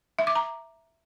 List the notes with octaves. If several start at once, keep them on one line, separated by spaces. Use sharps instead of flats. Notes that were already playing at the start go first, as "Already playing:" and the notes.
E5
D6
A#5